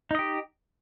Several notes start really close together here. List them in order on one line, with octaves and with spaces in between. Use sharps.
D#4 D#5 G4